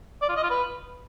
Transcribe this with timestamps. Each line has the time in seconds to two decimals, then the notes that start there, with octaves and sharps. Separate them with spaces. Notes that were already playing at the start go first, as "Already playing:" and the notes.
0.22 D5
0.29 F4
0.36 D#5
0.43 F4
0.51 B4